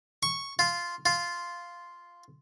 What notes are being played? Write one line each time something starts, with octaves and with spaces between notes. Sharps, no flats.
C#6
F4
F4